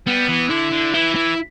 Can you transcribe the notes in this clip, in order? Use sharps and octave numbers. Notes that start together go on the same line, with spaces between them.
G3 B3
E3
D3 E4
D3
E3 E4
E4